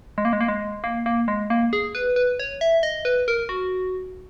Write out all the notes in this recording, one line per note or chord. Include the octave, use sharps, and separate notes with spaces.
G#3
A#3
G#3
A#3
G#3
A#3
A#3
G#3
A#3
G#4
B4
B4
C#5
E5
D#5
B4
A#4
F#4